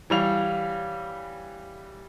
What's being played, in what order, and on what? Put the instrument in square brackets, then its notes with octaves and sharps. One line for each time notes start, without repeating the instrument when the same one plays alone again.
[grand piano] E3 G3 F7 [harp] C#5 F5